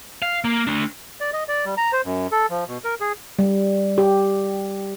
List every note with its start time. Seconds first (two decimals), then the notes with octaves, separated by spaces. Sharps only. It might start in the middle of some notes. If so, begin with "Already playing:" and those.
0.22 F5
0.44 A#3
0.67 A3 D4
1.21 D5
1.33 D#5
1.48 D5
1.65 G3
1.77 A#5
1.93 C5
2.05 F#2
2.32 A4
2.50 F3
2.68 B2
2.84 A#4
3.01 G#4
3.39 G3
3.98 G4